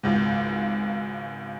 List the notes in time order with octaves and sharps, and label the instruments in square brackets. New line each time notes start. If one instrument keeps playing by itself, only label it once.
[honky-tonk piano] G#1 C#2 G#2